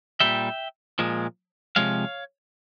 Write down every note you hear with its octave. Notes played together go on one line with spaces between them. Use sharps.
A#2 G3 E5 G5
A#2 F3 G#3
C3 F3 G#3 C#5 F5